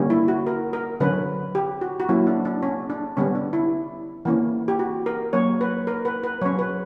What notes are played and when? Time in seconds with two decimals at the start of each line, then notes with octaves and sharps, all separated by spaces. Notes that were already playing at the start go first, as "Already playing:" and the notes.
Already playing: D3 G3 A#3 C#4
0.10 E4
0.28 F#4
0.46 A#4
0.73 A#4
1.00 D3 F#3 C#4 B4
1.55 G4
1.81 F#4
2.00 F#4
2.09 F#3 A#3 C#4 E4
2.27 D4
2.45 D4
2.63 C#4
2.90 D4
3.17 D3 G3 B3 C#4
3.35 D4
3.53 E4
4.25 E3 A#3 C#4
4.68 G4
4.79 F#4
5.06 A#4
5.33 F#3 A#3 C#4 C#5
5.61 B4
5.87 A#4
6.05 B4
6.24 B4
6.41 F#3 C#5
6.46 C#4
6.59 B4